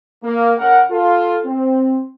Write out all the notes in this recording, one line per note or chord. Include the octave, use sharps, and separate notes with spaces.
A#3
C#3 A#4 F#5
F4 A4
C4